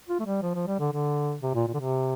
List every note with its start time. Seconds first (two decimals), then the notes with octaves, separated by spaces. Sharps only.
0.09 F4
0.20 A3
0.25 G3
0.42 F3
0.55 F3
0.67 G3
0.79 D3
0.92 D3
1.42 C3
1.55 A#2
1.67 A#2
1.74 D3
1.80 C3